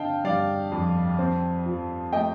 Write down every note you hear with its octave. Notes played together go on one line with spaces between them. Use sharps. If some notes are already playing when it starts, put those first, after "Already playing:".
Already playing: D3 C4 D#5 F5 G5 A5
G3 D5 F5
F2
C4
F3
A3 D#5 G5